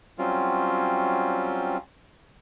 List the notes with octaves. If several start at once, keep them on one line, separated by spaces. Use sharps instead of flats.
F#3 G3 C4 C#4 F4